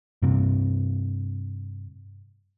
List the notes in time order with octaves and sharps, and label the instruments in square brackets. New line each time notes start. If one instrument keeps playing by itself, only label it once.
[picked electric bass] G2 C3